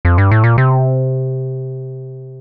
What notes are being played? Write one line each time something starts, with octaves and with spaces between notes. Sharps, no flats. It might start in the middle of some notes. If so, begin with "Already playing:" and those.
F2
G2
A2
A#2
C3